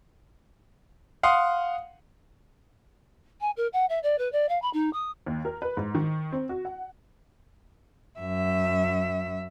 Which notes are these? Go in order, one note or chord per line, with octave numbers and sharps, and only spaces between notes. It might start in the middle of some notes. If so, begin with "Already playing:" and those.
F5 F#5 C6 D#6
G#5
A#4
F#5
E5
D5
B4
D5
F5
B5
D#4
D#6
D#2
A#4
B4
G#2
D#3
C4
F#4
F#5
F#2 E5